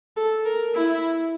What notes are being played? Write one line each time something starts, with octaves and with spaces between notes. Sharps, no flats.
A4
A#4
E4